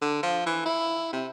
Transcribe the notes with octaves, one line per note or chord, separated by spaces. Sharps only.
D3
F3
E3
E4
C3